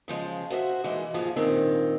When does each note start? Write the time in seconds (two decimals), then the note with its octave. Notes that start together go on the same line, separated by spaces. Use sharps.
0.08 C#3 F3 G#3
0.50 F#4 C5 D#5 E5
0.84 E3 G#3 A#3 D#4
1.14 D#2 G#2 F3 G#4 F5
1.36 G2 A#2 D#3 C4